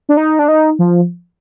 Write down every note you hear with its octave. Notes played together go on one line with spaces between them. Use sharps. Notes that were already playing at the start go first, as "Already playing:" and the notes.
D4
D#4
D4
D#4
F3